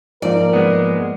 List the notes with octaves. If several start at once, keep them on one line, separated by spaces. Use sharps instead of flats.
G#2 F3 A#3 A#4 D5
G#3 B3